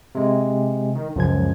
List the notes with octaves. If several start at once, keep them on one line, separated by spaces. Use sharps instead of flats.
C3 G#3
D#3
C#2 F#2 F3 G#6